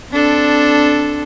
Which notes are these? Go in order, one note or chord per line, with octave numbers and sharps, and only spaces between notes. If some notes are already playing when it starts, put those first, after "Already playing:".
C4 D4 A4